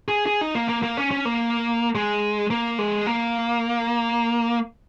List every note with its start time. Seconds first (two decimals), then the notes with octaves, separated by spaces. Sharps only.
0.08 G#4
0.26 G#4
0.41 D#4
0.55 A#3
0.69 A#3
0.83 A#3
0.97 C#4
1.11 C#4
1.25 A#3
1.95 G#3
2.50 A#3
2.79 G#3
3.07 A#3